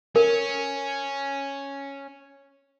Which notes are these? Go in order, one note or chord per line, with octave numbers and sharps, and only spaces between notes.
C#4 A#4